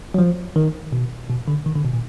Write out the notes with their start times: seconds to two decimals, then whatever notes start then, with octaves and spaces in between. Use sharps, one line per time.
0.14 F#3
0.19 F3
0.56 D#3
0.93 B2
1.29 B2
1.48 D3
1.66 D#3
1.75 D3
1.84 B2
1.93 A#2